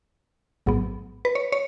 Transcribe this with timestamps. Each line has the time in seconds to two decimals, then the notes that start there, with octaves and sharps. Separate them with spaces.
0.66 A1 G#2 F#3 B3
1.25 B4
1.35 C#5
1.52 C#5